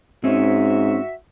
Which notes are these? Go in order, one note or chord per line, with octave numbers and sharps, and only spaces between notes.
G#2 C4 C#4 D#4 F#4 E5